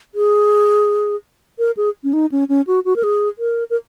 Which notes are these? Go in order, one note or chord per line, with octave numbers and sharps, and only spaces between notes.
G#4
A#4
G#4
C#4
D#4
C#4
C#4
F#4
F#4
A#4
G#4
A#4
A#4